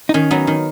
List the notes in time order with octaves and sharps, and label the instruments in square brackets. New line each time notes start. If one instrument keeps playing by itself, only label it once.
[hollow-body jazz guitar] D#4
[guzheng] D#3 [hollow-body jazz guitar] C#4
[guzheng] F#3 B3 D#4
D#3